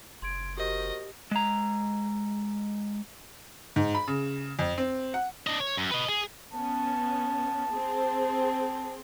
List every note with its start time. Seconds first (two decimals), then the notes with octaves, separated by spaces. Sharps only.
0.22 F#1 C6 G#6 D7
0.57 F#4 G4 A#4 C5 D#5
1.31 G#3 A#5
3.76 G#2
3.95 B5
4.08 C#3
4.59 F2
4.78 C4
5.14 F#5
5.47 D4 D#5
5.60 C#5
5.77 F#2
5.91 B4 D#5
6.09 G#4
6.53 B3 C#4 A5
7.71 C4 G#4 C5